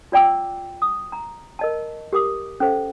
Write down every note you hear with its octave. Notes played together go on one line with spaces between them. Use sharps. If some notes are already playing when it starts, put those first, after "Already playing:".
F4 D5 G5 D6 E6
D#6
A#5
A#4 D#5 A5
G4 A#4 D6 D#6
C#4 A4 C5 F5